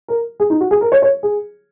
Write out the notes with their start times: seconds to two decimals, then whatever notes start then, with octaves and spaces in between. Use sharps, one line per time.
0.08 A#4
0.40 G#4
0.50 D#4
0.60 F#4
0.71 G#4
0.81 A#4
0.92 C#5
1.02 C#5
1.23 G#4